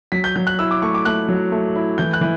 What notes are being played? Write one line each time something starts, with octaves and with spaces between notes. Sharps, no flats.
F#3 B6
G6
F#3 G6
F#6
E4 E6
D6
A3 C#6
D6
A3 F#6
F#3
A3
E4
E3 G6
F#6
E3